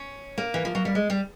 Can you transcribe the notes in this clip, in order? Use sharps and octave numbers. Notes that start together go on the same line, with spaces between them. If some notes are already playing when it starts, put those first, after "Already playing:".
Already playing: C#4
A#3
E3
F3
F#3
G3
G#3
G3